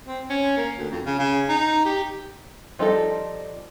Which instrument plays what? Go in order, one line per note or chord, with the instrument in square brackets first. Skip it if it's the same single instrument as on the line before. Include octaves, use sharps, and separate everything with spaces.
[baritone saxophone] C4
C#4
A#3
D2
F2
C#3
C#3
D#4
G4
[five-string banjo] F3 G3 D#4 F4 A4